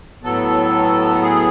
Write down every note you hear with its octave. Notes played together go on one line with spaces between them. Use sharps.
A2 F#3 B3 A4
G#4